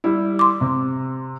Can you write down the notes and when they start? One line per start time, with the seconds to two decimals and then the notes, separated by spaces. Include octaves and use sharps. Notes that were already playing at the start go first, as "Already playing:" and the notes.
0.04 G3 E4
0.39 C6 D6
0.61 C3